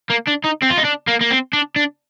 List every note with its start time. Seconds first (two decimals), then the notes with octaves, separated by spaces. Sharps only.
0.10 A#3
0.27 D4
0.44 D#4
0.62 C4
0.70 F4
0.77 D#4
0.84 D4
1.07 A#3
1.21 A#3
1.30 C4
1.53 D4
1.76 D4